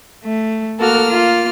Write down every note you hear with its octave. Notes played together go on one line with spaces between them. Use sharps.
A3
A#3 F#4 A4 F6
F4